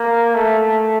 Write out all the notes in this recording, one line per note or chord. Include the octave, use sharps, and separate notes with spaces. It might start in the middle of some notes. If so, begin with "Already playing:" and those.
Already playing: A#3
A3